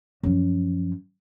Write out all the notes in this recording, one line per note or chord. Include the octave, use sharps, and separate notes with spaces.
F#2 F3